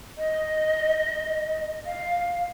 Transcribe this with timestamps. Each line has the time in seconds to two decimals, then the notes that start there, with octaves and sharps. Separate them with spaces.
0.18 D#5
1.86 F5